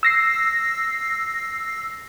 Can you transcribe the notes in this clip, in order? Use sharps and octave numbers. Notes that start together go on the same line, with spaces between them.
E6 A#6 C7